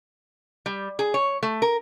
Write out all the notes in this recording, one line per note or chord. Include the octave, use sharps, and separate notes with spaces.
G3
G#4
C#5
A3
A#4